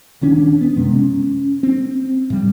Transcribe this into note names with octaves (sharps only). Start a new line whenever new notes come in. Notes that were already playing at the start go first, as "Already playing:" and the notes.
D#1 D#3 C#4 D4
B3
F#2 C3 G#3
C#4
C4
A2 G3